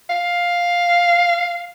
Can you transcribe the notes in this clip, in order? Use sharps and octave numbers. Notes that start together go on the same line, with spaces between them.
F5